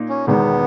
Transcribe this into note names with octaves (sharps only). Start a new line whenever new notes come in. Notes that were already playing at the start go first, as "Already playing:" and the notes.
Already playing: A#2 A#3 D#4
C#4
E1 E2 D#3 G#3 B3